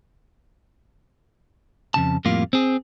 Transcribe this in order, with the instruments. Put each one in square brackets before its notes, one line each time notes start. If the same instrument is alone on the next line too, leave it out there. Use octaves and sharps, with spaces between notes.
[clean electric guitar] F2 C#3 A5
F2 A2 G3 A#3 F4
C4 G#4